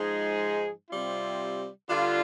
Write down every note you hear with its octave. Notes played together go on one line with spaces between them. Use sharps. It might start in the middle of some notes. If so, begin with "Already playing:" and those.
Already playing: G#2 F3 G#3 D#4 G#4
C3 G3 C4 F4
D3 G3 D4 F4